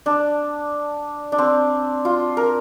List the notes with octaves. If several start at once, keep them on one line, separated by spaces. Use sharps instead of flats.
D4
D4
C4
F4
A#4